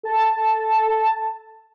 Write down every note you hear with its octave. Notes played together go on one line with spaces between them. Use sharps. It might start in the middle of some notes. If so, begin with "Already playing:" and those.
A4 A5